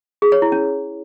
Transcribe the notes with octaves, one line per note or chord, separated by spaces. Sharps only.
G#4
C#5
E4
C#4